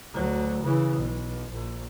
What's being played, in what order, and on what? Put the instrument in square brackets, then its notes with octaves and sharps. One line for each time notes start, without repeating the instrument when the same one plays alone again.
[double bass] D2 F#3
C#3 E3
B1
A#1